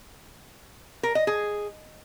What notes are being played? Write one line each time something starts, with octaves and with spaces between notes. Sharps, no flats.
A#4
D#5
G#4